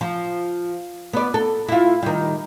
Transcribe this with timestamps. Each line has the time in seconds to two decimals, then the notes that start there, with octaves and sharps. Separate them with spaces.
0.01 F3
1.13 B3 D5
1.34 A4
1.68 E4 F4
2.03 D#3 G3